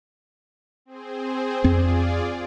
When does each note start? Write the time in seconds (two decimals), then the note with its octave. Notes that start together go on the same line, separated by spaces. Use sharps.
0.85 C4 G#4 C5
1.64 F2 C4 F4 G#4 D5